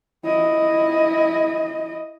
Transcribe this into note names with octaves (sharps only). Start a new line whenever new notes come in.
E4 D#5